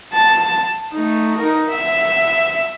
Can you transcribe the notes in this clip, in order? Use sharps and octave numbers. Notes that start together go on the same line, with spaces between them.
A5
A3 D#4
D#4 A#4
E5